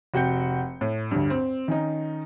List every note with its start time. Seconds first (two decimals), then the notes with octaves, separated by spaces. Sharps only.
0.14 F1 F#4 G5 G6 C#7
0.81 A2
1.11 D2 G2
1.30 C4
1.68 D#3 C#4 D#4